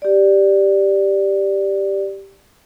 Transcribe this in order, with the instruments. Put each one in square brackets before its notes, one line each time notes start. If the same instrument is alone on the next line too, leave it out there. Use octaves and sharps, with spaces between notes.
[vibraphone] G4 D5